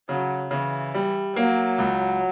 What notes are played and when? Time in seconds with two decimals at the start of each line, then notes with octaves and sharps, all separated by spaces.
0.09 C#3 F#3
0.51 C#3 E3
0.95 G3
1.36 F#3 A#3
1.78 C#2